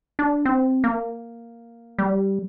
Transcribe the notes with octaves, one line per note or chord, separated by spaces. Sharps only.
D4
C4
A#3
G3